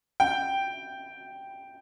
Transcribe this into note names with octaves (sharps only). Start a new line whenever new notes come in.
G5